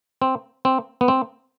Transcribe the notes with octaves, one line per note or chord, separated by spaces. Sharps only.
C4
C4
B3
C4